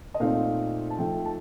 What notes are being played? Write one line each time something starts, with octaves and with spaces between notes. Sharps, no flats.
D#5
A#2 A3 C4 D#4 F5
A5
F3 A3 D#4 G5
A5